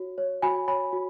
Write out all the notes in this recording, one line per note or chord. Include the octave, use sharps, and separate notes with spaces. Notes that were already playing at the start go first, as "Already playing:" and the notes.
Already playing: F#4 C#5
C#5
F#4 G#5 B5
C#5 G#5 B5
F#4